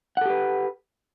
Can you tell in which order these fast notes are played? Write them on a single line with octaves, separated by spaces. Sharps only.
F#5 A4 G4 B4